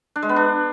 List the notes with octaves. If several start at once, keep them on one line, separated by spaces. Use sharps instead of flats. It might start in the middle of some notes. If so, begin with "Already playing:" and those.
D4
G#3
B3
D4